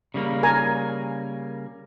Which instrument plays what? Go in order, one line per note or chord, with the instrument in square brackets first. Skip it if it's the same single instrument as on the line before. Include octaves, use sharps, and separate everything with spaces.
[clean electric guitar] C#3 G3 A#3
[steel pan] A#4 G#5 A#5